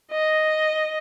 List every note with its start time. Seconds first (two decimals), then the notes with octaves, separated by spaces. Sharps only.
0.11 D#5